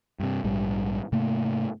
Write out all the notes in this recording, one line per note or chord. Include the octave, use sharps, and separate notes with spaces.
G2 C3
A#1 G#2 G3
G#2 C3 A3 A#3